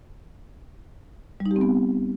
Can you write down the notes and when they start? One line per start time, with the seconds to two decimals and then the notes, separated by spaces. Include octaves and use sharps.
1.40 G3
1.46 D#4
1.51 G4
1.56 C4
1.61 B3